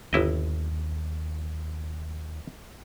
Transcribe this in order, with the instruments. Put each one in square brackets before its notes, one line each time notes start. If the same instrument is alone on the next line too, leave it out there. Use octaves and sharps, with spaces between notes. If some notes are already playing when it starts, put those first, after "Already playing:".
[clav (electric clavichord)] G1 E4 D#5 [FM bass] D#2